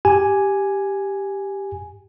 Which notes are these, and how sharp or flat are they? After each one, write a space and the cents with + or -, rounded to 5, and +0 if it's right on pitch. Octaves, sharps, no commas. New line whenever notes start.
G4 +0 G#5 +0